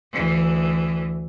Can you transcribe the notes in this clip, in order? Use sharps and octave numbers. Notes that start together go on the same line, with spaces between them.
D2 E3